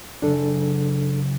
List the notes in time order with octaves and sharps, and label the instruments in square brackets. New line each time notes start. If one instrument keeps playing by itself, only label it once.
[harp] F#1 C#3 [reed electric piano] D4 A4